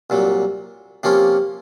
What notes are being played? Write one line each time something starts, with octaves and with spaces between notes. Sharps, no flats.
C2 A#2 F#3
C3 F3 A#3 C#4 F4